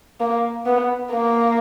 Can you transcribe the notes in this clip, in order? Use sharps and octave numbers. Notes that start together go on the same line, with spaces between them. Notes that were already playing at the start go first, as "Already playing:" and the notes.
A#3
B3
A#3